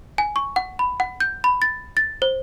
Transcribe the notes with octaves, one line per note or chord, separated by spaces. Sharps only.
G#5
C#6
F#5
B5
F#5
G6
B5
A6
A6
C5